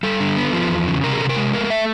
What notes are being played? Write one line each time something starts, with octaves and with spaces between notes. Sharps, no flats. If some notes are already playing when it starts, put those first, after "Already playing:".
G3 A4
D3
B3
F3
E2
C#3
C3 A#4
G#4
C3 A4
A#4
G#3
A3 A#4
A3 E5